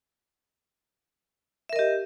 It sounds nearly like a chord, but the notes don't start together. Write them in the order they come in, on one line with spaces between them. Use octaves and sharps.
E5 A#4 D#5 G4